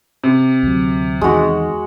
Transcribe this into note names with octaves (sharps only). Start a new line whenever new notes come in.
C3
D2 F#3
E2 D#3 G#3 F#4